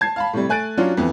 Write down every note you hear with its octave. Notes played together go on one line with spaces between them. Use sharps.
A5 G#6 C7
F5 A5 B5
A2 C3 G3
A3 G#5 F#6 A6 D7
F#3 C#4 D4 F4 F#4
F2 E3 B3